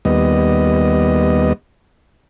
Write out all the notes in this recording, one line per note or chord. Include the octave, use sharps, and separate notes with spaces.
D#2 G3 B3 D#5